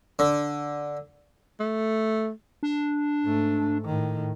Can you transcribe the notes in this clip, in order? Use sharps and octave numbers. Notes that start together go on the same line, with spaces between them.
D3
A3
D4
G#2 A3
A2 D#3